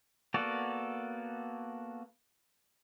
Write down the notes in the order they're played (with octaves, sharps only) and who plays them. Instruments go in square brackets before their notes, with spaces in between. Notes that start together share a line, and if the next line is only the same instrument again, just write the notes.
[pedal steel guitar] A#3 B3 F#4 A4 D5